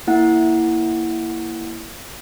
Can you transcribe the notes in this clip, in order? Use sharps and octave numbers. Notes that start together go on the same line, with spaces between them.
A#3 E4 F#5